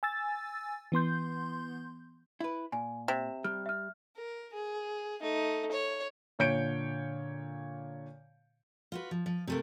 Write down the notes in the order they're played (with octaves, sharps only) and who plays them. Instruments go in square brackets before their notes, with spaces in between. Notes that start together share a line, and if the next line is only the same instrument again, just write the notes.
[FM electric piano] G#5 E6 A6
E3 B3 C6 G6
[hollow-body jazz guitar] E4 B4
[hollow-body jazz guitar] A#2 [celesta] G#5
[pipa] C3 [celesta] E7
[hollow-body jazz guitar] G3 [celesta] F6
[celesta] E5 F6
[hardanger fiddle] A#4
G#4
A3 D#4
C#5
[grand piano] A#2 D3 C#5 G6 C#7 D7
[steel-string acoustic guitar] F4 F#4 B4
F3
F3
C3 A3 A#3